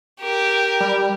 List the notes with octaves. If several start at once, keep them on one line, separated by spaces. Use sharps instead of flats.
G4 A#4
G3